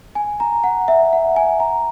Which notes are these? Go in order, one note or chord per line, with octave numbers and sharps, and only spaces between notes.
G#5
A#5
F#5
E5
F#5
G#5
A#5